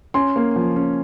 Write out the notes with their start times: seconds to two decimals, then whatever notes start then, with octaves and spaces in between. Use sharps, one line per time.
0.14 C#4 G#5 C6
0.36 A#3
0.56 F3
0.76 C#4